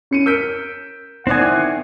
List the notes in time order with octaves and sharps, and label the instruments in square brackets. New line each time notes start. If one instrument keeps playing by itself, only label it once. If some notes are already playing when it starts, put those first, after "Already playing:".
[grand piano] C#4 C#7 D#7
[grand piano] A#4 F6 D7 [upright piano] E6 G6 B6
[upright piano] D#3 D5 D#6 [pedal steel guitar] C4 G#5 [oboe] F#5
[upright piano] D#3 E4 [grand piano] D6